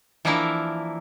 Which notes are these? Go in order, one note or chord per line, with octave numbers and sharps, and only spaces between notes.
E3 F3 A#3 D4 E4 A#4